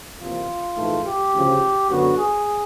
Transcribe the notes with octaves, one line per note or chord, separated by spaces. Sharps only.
E2 C3 F3 A#3 F4
A#1 G#2 E3 A3
G4
D2 C#3 F3
F#2 D3 F#3 B3 F#4
G#4